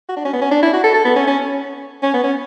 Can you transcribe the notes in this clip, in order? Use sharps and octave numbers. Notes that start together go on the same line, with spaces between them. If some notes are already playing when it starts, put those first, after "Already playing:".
F#4
D4
C#4
B3
C#4
D4
E4
F#4
A4
A4
B3
C#4
C#4
C#4
B3
C#4